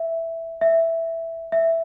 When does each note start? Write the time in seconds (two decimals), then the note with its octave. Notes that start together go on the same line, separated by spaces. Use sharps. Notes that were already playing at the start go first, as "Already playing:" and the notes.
Already playing: E5
0.61 E5
1.52 E5